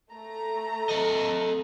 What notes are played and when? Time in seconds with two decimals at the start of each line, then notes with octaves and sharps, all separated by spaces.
0.10 A3 A#5
0.89 A4 D#5